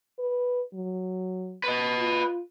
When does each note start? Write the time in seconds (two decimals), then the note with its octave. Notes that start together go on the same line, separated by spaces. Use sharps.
0.19 B4
0.74 F#3
1.64 B4 D#5
1.98 F4